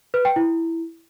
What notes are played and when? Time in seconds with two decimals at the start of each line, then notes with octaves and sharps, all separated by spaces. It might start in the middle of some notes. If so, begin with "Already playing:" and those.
0.14 B4
0.25 G5
0.36 E4